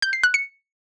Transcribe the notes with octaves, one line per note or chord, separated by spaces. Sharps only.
G6
C7
F#6
C#7